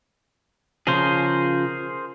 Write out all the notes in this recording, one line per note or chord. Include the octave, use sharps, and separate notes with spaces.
C#3 F3 G#4 A#4 C5